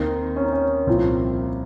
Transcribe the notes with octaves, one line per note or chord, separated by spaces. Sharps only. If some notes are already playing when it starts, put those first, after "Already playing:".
Already playing: D#2 D#3 C4 D#4
C#4
D#4
C#4
C2 A#2 F3 C4